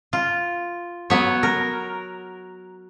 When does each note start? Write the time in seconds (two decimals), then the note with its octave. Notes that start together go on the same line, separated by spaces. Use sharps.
0.13 F4
1.10 F#3 B3 C#5
1.43 A#4